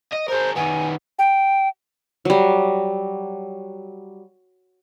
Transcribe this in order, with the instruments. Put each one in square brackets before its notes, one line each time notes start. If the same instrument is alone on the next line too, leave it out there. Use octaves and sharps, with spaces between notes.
[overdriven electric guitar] D#5
[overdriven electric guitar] G#4 A#4 [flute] C5
[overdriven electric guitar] D#3 B3 [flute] G#5
[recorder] G5
[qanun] F#3 G3